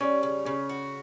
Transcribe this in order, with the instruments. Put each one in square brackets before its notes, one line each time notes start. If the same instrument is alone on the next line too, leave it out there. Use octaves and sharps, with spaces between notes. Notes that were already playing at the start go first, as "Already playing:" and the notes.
[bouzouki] G3 [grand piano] C#4
[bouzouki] C#3
[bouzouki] C#3 [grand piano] C#4
[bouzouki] F#4